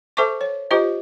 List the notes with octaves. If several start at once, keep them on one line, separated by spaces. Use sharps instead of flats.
A4 C5 E5 A5 C#6 D6
C#5
F4 G4 C5 D#5